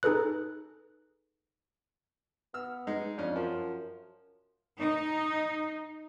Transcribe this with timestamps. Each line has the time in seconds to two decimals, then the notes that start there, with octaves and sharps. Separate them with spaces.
0.03 D#4 G#4 A4 B4 F#6
2.54 B3 E6 F6
2.87 G#3 D#4 G#4
3.18 F2 C#4 D4
3.36 F#2 F3
4.80 D#4